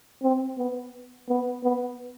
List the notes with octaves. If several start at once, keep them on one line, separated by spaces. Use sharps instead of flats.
C4
B3
B3
B3